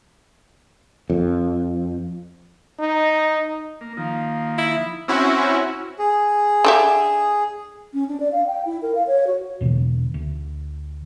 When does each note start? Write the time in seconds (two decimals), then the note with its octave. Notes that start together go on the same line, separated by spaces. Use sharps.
1.10 F2
2.79 D#4
3.81 A#3
3.97 D#3 F3 A#3
4.58 E4
5.08 C4 C#4 E4 F#4
5.99 G#4
6.64 D3 G4 E5
7.94 C#4
8.08 D4
8.20 D5
8.32 F5
8.47 G5
8.65 E4
8.82 A#4
8.95 F5
9.07 C#5
9.27 F#4
9.61 E2 B2 D3 E3
10.14 D2